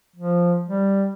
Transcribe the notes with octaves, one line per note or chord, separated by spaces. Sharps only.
F3
G3